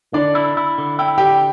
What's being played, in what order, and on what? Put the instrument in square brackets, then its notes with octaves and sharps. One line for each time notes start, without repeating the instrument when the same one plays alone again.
[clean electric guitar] D3 [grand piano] D4 D5
[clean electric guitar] E4
E4
D3
[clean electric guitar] E4 [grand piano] G5
[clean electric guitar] D3 [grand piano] G4 G5